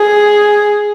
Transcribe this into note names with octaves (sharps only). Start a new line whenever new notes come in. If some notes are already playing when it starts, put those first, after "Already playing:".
Already playing: G#4